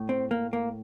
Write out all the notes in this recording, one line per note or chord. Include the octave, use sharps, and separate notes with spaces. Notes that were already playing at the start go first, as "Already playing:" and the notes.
Already playing: A2
C4
A#3
A#3